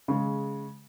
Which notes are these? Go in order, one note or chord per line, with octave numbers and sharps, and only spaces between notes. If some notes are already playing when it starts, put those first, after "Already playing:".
C#3 G#3